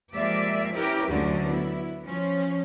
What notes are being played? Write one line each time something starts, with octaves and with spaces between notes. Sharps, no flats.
F3 G#3 A#3 G4 D5 E5
C#4 E4 G4 A#4 B4
D2 D3 F#3 A3 C#4
B3 E4
F3 C#4